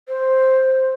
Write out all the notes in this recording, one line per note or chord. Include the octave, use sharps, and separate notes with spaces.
C5